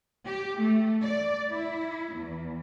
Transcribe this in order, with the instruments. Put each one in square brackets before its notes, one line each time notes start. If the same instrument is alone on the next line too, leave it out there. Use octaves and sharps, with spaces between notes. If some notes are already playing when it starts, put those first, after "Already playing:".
[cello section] G4
A3
D5
E4
E2